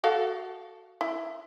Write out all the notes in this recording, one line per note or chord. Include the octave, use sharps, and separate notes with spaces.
F#4 A4 F5
E4